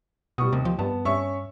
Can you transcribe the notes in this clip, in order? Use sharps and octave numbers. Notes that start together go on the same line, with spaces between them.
B2 G3 C#6 D#6
D#2 C3
F3
G2 B3 A5
G2 C#4 E5 C#6